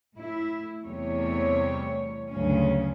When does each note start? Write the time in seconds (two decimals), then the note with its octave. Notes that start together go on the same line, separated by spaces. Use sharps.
0.16 A2 E4
0.84 E2 C3 G3 A3 C#5
2.31 D2 G2 C#3 F#3 C#4